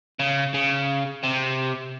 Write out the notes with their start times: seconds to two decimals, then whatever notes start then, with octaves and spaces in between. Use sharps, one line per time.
0.19 C#3
0.54 C#3
1.23 C3